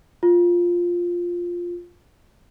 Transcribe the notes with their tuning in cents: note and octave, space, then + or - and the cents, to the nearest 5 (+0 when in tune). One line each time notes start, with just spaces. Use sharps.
F4 +5